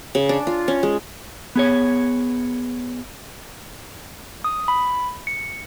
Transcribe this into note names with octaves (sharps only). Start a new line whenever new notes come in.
C#3
D4
F4
C#4
G#3
B3 G#4 C#5
D#6
B5
C#7